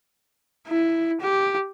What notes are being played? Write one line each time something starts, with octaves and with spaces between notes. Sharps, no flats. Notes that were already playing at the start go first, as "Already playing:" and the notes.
E4
G4